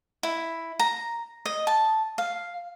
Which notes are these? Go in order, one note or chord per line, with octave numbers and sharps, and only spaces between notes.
E4
A#5
D#5
A5
F5